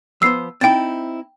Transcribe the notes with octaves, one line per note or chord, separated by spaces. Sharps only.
F3 B3 C5 E6 C7
C4 D#4 E4 G5 A6